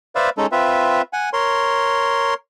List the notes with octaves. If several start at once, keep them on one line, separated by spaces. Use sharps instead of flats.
B4 C5 D5 E5 F5
G#3 C#4 D#4 A4
C4 F4 B4 E5
F#5 G#5
A#4 C#5 C6